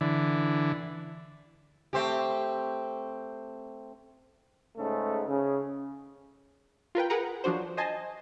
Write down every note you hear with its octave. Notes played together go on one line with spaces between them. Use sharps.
D3 E3
A3 C4 G4
G#2 C#3 A3
C#3
F4 A#4 B4 G5
G#4 A#4 B4 F#5 A#5
F3 F#3 D4 F#4 C5
C5 D#5 G#5 A5